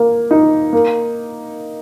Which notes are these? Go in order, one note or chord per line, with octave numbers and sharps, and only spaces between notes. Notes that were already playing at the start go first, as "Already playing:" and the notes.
Already playing: A#3
D#4
A#3